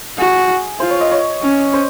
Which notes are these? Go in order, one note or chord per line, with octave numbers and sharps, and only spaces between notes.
F#4 G#4
F4 C5
C#5
D#5
C#5
C#4
C5